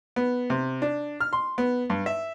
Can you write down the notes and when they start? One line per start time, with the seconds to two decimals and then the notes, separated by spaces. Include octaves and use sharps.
0.16 B3
0.50 C3
0.82 D4
1.21 F6
1.33 C6
1.58 B3
1.90 G2
2.06 E5